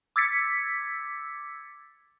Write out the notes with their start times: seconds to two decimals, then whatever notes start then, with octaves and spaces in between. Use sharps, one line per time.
0.16 D6 E6 G#6 A6 B6 C#7